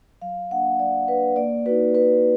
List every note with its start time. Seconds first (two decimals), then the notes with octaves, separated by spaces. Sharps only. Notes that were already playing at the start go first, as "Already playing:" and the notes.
0.21 F#3 F5
0.51 A#3 D4 F#5
0.79 F#3 D5
1.08 A#3 D4 B4
1.36 A#3 D5
1.66 D#4 F#4 B4
1.94 A#3 B4